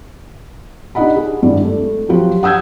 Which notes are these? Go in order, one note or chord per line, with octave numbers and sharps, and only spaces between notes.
D4 D#4 G4 D#5 F#5 B5
G#4
G#1 G2 E4 D5
A3
F3 F#3 F#4 G4 C5
F#5 D#6 E6 G6 G#6